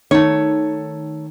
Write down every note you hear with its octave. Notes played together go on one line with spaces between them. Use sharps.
D#3 A3 C#5